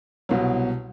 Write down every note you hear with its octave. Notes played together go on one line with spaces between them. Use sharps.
C2 B2 F#3